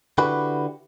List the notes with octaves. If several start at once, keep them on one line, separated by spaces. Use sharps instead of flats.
D3 E4 F#4 G4 B4